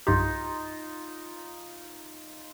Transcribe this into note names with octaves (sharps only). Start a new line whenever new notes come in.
B1 G2 D#4 F4 G4